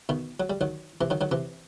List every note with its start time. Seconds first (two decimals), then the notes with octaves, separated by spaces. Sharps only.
0.09 B2 D#3
0.40 F#3
0.50 G3
0.61 D#3 F#3
1.01 C3 E3
1.10 D#3 F#3
1.21 D#3 F#3
1.31 C3 E3